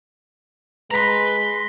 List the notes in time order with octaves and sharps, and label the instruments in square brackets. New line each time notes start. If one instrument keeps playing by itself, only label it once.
[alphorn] G#3 [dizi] B4 [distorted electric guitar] A#5 C6 [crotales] A#6 B6